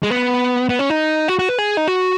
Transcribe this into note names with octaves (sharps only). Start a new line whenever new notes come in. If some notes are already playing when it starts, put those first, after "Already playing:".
G#3
B3
B3
C#4
D#4
F#4
F#4
B4
G#4
D#4
F#4